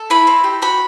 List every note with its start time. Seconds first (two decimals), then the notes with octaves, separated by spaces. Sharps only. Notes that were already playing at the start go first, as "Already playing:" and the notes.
Already playing: A4
0.10 E4 B5
0.27 C4
0.44 G4
0.62 F#4 B5